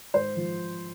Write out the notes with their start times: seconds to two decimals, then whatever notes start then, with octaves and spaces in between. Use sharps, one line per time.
0.14 G#2 C5
0.37 F3